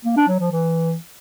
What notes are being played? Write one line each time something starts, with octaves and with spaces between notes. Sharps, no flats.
A#3
D4
F#3
F3
E3